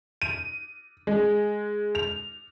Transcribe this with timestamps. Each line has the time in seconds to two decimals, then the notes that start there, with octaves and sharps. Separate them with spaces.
0.22 D#7
1.07 G#3
1.95 F7